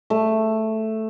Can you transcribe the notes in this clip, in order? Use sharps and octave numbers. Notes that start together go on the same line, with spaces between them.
A3